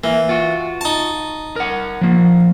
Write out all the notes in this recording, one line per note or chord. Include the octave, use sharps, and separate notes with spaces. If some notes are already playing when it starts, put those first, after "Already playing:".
E3 A#3
F4 F#4
D#4 A5
A#4 F#5
F3 A#3